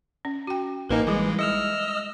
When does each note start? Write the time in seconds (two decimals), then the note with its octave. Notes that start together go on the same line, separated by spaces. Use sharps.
0.25 C#4
0.47 F#4 G5
0.89 A1 A#3 D#4 A#4 B4 G#5
1.07 E3 G3 G#3 D6
1.39 G#3 D#5 E6 F6